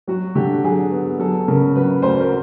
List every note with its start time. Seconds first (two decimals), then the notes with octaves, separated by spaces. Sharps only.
0.07 F#3 F#4
0.35 D3 G4
0.63 F#3 G#4
0.92 B3
1.19 F#3 A4
1.48 C#3 A#4
1.76 F#3 B4
2.02 D2 C5
2.20 A#4